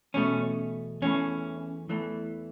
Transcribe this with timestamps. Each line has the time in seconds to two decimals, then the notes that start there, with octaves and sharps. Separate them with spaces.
0.14 E2 B2 A3 C#4
1.02 E2 E3 A3 C#4
1.89 E2 E3 A3